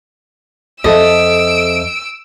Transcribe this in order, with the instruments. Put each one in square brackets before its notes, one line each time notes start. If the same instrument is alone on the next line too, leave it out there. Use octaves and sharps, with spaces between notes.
[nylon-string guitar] F2 A4 E5 [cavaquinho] D#5 [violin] E6 D7